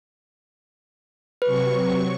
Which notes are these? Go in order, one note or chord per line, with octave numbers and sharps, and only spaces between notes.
C3 F#3 B4 C#6